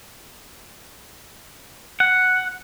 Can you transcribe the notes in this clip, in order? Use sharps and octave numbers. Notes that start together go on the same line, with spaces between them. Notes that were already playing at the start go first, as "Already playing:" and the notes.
F#5